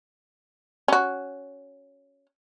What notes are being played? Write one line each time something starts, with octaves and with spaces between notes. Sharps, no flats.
C#4 F#4